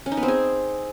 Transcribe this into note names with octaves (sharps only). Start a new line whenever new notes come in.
C#4
D#4
B3
C4
G#4